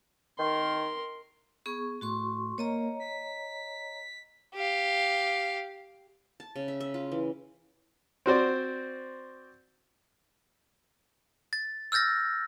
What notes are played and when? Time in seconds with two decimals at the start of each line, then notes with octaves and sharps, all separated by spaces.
0.38 D#3 A#4 C6
1.66 B3 G#4 C#6
2.01 A2 F#4 C6 C#6
2.58 A#3 C#5 D#5 A#5
3.00 B6
4.55 G4 F5
6.40 A5
6.56 C#3
6.68 E5
6.80 E5
6.94 F4
7.12 E3
8.26 C4 F#4 C5 D5
11.53 A6
11.92 E6 F6 G6 A6 A#6